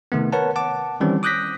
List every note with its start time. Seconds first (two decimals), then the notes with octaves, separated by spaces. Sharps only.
0.12 C3 D#3 A3 B3
0.32 A#4 B4 C#5 F#5 A5
0.56 F#5 A5 D6
1.01 D#3 E3 G3 C4 C#4
1.23 D6 D#6 F#6 G6 A#6 B6